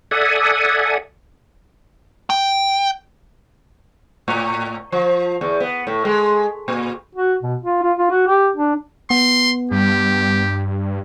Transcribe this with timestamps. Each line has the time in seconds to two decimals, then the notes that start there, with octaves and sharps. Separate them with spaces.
0.11 A4 D5 E5 F#5 G#5 D#6
2.30 G5
4.28 A2
4.92 F3
5.41 E2
5.60 B3
5.87 A2
6.05 G#3
6.68 A#2
7.15 F#4
7.42 B2
7.62 F4
7.83 F4
7.98 F4
8.10 F#4
8.27 G4
8.56 D4
9.10 B3 C6
9.71 G2 G4